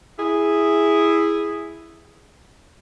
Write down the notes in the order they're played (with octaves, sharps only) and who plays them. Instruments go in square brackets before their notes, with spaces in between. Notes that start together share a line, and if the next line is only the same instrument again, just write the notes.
[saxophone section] E4 G#4